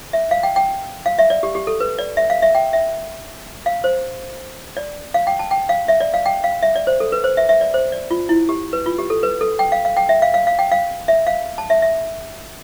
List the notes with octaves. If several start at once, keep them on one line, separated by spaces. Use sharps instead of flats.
E5
F5
G5
G5
F5
E5
D5
G4
G4
A4
B4
D5
E5
F5
E5
G5
E5
F5
C5
D5
F5
G5
A5
G5
F5
E5
D5
F5
G5
F5
E5
D5
C5
A4
B4
C5
E5
E5
D5
C5
D5
F4
E4
G4
B4
F4
G4
A4
B4
A4
G5
F5
F5
G5
E5
F5
F5
F5
G5
F5
E5
F5
A5
E5
E5